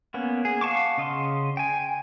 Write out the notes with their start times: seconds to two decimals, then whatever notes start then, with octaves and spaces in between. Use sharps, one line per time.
0.14 A#3 B3 C#4
0.45 G#4
0.61 F5 F#5 A5 C#6 D6
0.98 C#3 D#5 F5 C6
1.57 G5 G#5